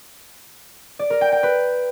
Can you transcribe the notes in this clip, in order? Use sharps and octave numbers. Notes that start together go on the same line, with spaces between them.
D5
A#4
G5
G5
B4